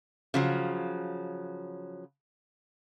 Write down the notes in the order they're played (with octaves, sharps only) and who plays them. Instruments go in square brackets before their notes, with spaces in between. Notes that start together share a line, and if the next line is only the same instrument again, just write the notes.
[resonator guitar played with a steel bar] C#3 F3 F#3